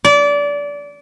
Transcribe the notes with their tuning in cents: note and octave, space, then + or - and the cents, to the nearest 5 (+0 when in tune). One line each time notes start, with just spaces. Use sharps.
D5 -25